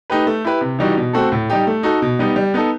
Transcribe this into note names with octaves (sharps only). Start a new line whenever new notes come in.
A3 D#4 G4 B4
A3
E4 G4 B4
C3
E3 G3 D#4 F#4
B2
A3 C4 F#4 A4
A2
G3 D#4 G4
A3
D#4 F#4 A4
B2
G3 B3 D#4
G3
B3 D#4 A4